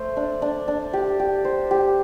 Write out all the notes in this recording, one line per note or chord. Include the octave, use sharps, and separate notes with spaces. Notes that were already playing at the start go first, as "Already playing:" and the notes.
Already playing: A3 C5
D4
D4
D4
G4
G4
C5
G4